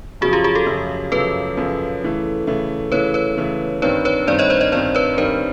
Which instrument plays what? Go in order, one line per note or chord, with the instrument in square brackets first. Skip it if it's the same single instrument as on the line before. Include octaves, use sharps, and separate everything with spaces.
[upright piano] F#2 C#3 F3 [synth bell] F#4 G#4
[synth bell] F4 G4
F#4 G#4
G4 A4
[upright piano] F#2 C#3 F3
[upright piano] F#2 C#3 F3 [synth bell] A4 B4
[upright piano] F#2 C#3 F3
C#3 E3 A3
C#3 E3 A3
[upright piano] C#3 E3 A3 [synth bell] B4 C#5
[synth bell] B4 C#5
[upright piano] C#3 E3 A3
[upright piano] G2 D#3 G3 C4 [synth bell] B4 C#5
[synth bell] B4 C#5
[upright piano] G2 D#3 G3 C4 [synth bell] C5 D5
[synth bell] C#5 D#5
C5 D5
C#5 D#5
[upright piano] G2 D#3 G3 C4 [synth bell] C5 D5
[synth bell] B4 C#5
[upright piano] G2 D#3 G3 C4 [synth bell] A#4 C5